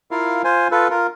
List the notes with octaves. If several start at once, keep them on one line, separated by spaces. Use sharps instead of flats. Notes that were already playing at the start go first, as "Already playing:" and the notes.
E4 F4 A#4 F5
F4 C5 G#5
F4 A4 B4
F4 A#4